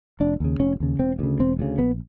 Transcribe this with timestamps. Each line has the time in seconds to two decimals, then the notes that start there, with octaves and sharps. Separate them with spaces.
0.20 F1 D4
0.40 D#2 C#3
0.60 F1 C#4
0.80 D#2 C#3
0.99 E1 C4
1.19 D2 C#3
1.40 E1 C4
1.59 D2 C#3
1.79 A#1 B3